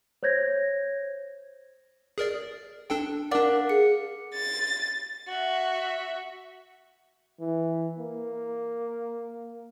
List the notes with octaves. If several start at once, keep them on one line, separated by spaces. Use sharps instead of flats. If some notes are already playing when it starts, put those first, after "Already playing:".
C5 C#5 G6 G#6 A#6
G#4 A#4 D5
D4 A4 G5
D4 A#4 D5 F5 F#5 D6
G#4 C#7
A6
F#4 E5
E3
A#3